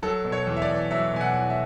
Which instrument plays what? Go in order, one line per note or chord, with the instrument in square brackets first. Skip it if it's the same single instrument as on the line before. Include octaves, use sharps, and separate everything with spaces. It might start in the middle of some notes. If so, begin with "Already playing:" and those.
[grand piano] F#3 A4
B2
C#5
E2
E5
D5
E2
F#3 E5
B2 G#5
F#5
E2
E5